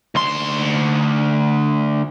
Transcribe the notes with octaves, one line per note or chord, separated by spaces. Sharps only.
D2 C6